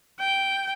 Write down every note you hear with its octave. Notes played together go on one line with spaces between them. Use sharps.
G5